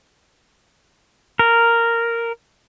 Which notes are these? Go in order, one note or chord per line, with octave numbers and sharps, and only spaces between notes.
A#4